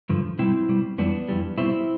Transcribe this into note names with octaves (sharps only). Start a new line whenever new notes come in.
G2 D3 F3
B2 G3 C4 E4
B2 G3
F2 E3 G3 B3 D4
F2 E3 G3
B2 G3 C4 E4